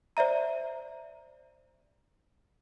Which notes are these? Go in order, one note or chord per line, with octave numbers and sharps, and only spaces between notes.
C5 D5 E5 A#5